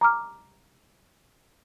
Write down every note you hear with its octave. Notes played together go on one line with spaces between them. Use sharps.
A#5 D6 F6